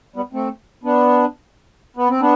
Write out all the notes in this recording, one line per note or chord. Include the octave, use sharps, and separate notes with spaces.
G3 B3
A3 C4
B3 D4
B3
C4
B3 D4